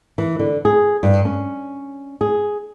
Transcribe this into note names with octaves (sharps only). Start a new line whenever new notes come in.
E3
D3
G#4
G2
C#4
G#4